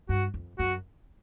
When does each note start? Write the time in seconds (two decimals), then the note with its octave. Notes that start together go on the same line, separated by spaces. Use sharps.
0.09 G2 F#4
0.34 F2
0.59 F#2 F#4